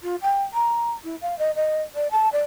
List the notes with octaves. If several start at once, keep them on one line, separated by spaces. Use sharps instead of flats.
F4
G5
A#5
E4
F5
D#5
D#5
D5
A5
D5